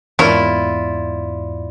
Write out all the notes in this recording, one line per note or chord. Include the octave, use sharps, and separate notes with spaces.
E2 G#2 A#3 E4 F4 C#5 D5